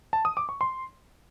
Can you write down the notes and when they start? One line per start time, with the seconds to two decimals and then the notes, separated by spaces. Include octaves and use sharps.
0.13 A5
0.25 D#6
0.37 D6
0.49 C#6
0.61 C6